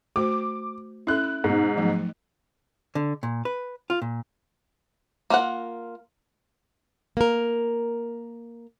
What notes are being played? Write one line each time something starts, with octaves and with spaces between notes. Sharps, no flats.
A3 F#4 C5 D6
C#4 E4 A4 F#6
G#2 B2 D#4
F3 F#3 A3
D3
A#2
B4
F4
A#2
A#3 F4 A#4 F#5
A#3 A#4